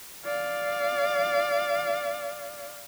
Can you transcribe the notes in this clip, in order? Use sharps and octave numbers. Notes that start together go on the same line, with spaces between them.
D5 F5